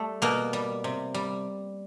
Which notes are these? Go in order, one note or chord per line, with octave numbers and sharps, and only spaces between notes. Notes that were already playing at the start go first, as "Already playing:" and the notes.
Already playing: G3 A3
B2 A#3
G3
C3
G3